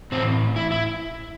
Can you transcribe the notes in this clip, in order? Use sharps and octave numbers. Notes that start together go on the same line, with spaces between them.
A2 E3 C4
E4
E4